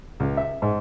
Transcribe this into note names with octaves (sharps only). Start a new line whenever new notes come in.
C#2
E5
G#2